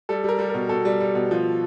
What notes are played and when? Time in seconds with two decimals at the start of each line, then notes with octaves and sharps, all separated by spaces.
0.09 G3 A4
0.24 G3 A#4
0.39 G3
0.50 B2 A#4
0.69 B2 A4
0.85 G3
1.00 G3
1.15 B2
1.31 F3